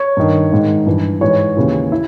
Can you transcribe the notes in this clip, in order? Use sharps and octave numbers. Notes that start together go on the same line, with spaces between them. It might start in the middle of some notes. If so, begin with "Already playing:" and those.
Already playing: C#5
G2 D#3
G#2 D#3
G2 E3
G#2 E3 C#5
D#2 C#3 E3
E4